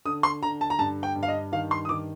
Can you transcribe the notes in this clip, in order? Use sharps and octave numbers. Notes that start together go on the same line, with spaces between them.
D3 D#6
C6
D3 A#5
A5
A#5
G2 A5
G5
G2
F5
D#5
D#3 F5
C6
D#6
D#3 D6